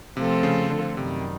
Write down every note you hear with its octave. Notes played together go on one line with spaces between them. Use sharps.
C3 F3 A3 C4 F4 A4
C#3
D3
F#2 C3 D#3 G3